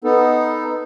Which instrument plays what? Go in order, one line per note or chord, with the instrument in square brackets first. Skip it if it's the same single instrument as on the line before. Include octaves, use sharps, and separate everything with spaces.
[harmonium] B3 D#4 A4